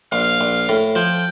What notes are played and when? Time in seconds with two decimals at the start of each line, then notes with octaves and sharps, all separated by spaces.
0.12 A#1 F5
0.41 A#1
0.69 A2
0.95 F3 G5